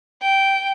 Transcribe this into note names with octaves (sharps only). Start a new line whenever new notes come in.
G5